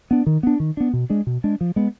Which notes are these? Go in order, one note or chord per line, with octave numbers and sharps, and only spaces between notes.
B3 D4
D#3
B3 D4
D#3
B3 D4
B2
G#3 D4
B2
G#3 D4
F3
G#3 B3